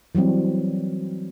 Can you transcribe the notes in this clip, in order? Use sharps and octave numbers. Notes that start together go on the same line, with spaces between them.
E3 F#3 G3 C4